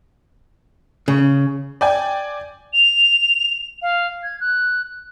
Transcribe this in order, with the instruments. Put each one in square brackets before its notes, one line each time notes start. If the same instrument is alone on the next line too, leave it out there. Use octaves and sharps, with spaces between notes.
[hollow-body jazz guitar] C#3
[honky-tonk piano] D5 G5 G#5
[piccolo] F7
F5
G#6
F#6